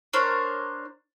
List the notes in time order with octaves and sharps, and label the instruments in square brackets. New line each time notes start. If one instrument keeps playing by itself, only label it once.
[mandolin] D4 A#4 C5 C#5